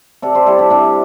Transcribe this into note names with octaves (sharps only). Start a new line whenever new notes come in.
C3 A4 D5
G4 C5
G3 E4 A4
D4 G4
C3 D4